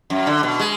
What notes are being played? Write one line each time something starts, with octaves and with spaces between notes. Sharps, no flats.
F#2
D3
B2
G#3